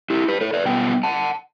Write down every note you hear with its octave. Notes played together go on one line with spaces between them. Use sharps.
E4 G4
G4 B4
A4 C#5
B4 D5
B2 G3 B3 G5
F#5 A5